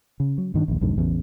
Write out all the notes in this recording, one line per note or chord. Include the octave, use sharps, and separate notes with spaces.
C#3
F#3
G2 D#3 A#3 D4
A#1 D#2
B1 F2 G#2 D3
A1 E2 C#3